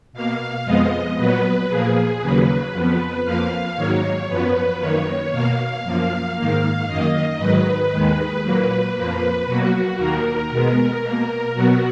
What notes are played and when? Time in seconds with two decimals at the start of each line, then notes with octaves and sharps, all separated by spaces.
0.13 B2 A#3 F5
0.65 F2 F3 G#3 B3 D#5
1.17 A#2 F#3 B3 B4
1.68 A#2 F3 A#3 G#4
2.21 D#2 C#3 F#3 A#3 B4
2.72 F2 F3 B3
3.24 F2 F3 A#3 F5
3.76 G#2 D#3 F#3 A#3 C#5
4.28 F#2 F3 B3 B4
4.80 F#2 D#3 A#3 C#5
5.31 B2 A#3 F5
5.83 F#2 F3 A#3
6.35 G#2 D#3 A#3
6.87 F#2 D#3 A#3 D#5
7.39 G#2 D#3 F#3 B4
7.91 D#2 D#3 G#3
8.43 A#2 F#3 A#3 B4
8.94 F2 F3 A#3 B4
9.46 B2 F#3 A#3 F#4
9.98 D#2 D#3 A#3 A#4
10.50 B2 G#3 B3
11.03 B2 A#3
11.54 B2 F#3 B3 F#4